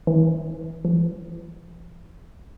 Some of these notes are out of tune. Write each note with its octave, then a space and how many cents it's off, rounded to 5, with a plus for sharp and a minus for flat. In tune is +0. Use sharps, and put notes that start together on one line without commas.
E3 -30
E3 +45